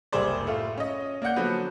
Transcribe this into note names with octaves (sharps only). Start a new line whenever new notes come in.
F#1 C2 G3 G#4 C5 D5
A2 A3 F4
C#4 D#5
A#3 D5 F#5 G6
D3 F3 F#3 A#3 B3